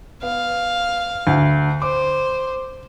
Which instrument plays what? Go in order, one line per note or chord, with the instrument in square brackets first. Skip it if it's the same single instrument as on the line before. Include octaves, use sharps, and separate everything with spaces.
[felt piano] B3 [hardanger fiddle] F5
[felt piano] D2
[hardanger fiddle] C5 [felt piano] D6